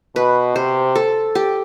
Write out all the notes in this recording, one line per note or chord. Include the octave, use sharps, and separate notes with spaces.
B2 B4
C3 C5
A4
G4